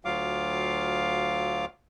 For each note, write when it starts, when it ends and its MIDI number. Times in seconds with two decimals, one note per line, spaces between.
0.05 1.65 38
0.05 1.65 54
0.05 1.65 65
0.05 1.65 77
0.05 1.65 86